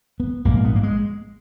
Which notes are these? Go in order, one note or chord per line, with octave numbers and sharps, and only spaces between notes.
B3
A#1 G#2 A#3
B3
A#3
G#3